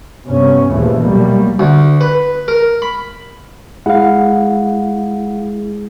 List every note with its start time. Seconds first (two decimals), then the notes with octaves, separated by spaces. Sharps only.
0.25 G2 C3 B3 C#4
0.69 A#1 D#2 C#3 E3 F3 A3
1.02 B2 F#3 G3 A3 A#3
1.59 D2
2.01 B4
2.48 A#4
2.82 B5
3.86 G#3 E4 G#4 F5 F#5